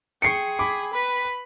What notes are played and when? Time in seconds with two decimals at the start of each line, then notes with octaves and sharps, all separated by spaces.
0.22 G#4 G5 C6 C#6 C7 C#7
0.59 G#5 B5 D6
0.93 B4 B5